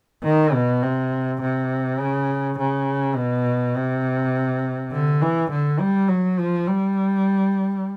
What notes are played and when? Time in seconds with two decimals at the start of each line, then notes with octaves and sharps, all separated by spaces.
0.24 D#3
0.54 B2
0.83 C3
1.42 C3
2.00 C#3
2.59 C#3
3.16 B2
3.76 C3
4.92 D3
5.22 E3
5.51 D3
5.80 G3
6.09 F#3
6.39 F3
6.68 G3